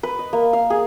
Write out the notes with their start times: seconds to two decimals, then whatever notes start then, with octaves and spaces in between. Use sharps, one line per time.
0.03 B4
0.19 D#5
0.33 A#3
0.53 F5
0.70 G#4